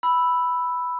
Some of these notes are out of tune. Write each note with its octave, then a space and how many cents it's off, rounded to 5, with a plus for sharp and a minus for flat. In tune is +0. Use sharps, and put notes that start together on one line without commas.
B5 +0 E6 +0